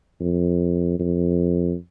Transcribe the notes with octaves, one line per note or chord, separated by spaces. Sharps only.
F2
F2